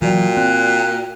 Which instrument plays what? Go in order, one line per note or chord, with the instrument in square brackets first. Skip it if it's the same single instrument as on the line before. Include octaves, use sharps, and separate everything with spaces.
[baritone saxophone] A#2 [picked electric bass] E3 F#3 [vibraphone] F#4 D5 G5
[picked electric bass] C4 [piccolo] F#6